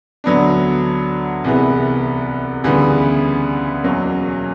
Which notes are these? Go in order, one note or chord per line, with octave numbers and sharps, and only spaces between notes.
D2 D3 F#3 B3 D4
C2 C3 E3 G#3 B3
D2 C#3 E3 G3 B3
E2 B2 F#3 A#3 C#4